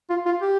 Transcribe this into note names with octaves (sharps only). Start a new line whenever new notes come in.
F4
F4
G4